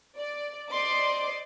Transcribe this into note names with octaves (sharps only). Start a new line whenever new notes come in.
D5
C5 D5 D#5 C6 D6